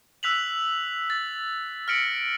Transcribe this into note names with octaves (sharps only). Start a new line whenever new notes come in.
E6 F#6 B6 F7 F#7
A6
F6 A#6 B6 C#7 D7 F#7